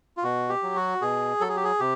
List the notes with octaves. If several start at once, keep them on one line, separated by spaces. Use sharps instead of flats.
F4
B2 F#4
G4
F#3
F#4
B2 G#4
F#3 A4
G#4
G4
G#4
C3 G4